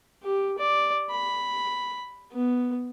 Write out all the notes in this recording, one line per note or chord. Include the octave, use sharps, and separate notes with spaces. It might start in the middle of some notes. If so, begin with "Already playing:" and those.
G4
D5
B5
B3